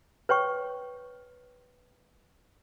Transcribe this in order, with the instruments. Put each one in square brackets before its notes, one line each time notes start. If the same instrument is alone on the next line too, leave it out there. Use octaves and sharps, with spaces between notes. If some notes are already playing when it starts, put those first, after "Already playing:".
[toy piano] B4 C#5 G5 C#6